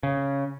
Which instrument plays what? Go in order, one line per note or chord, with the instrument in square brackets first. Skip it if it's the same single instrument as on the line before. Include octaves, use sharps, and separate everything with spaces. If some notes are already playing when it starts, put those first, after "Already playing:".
[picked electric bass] C#3